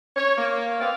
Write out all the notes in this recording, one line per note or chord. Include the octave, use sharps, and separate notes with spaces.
C#5
A#3
B3 C4 D5 F5